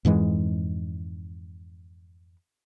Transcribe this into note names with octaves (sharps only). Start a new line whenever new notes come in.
F2 G#2 E3 G#3